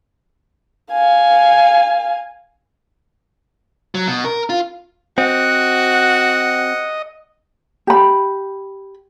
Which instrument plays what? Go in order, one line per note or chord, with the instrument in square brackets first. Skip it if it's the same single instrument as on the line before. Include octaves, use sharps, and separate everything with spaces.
[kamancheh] F5 G#5
[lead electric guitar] F#3
B2
A#4
F4
[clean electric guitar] C4 [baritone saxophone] F#4 [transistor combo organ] D#5 [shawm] F#5
[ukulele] G4 B5